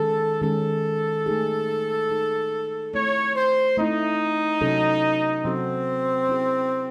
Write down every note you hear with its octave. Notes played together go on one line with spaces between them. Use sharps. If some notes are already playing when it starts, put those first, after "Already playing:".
Already playing: D#3 G#3 C#4 G#4 A4
D#3 G#3 C#4 G#4 A4
A3 D#4 G#4
A3 D#4 G#4
A3 C4 E4 C#5
C5
A3 C4 D#4 E4
C3 F#3 C#4 F#4 A4
C3 F#3 C4 C#4 F#4 A4
F#3 C#4 E4 G#4